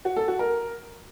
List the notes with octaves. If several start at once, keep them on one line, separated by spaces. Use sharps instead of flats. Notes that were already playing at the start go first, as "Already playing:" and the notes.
F#4
A4
F#4
A#4